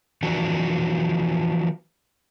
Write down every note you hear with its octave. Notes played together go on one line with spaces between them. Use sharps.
E3 F3 D4 F#4